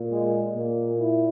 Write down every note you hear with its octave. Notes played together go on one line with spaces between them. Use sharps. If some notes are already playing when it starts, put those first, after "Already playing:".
Already playing: A#2
G#3
A#2 A#3
E4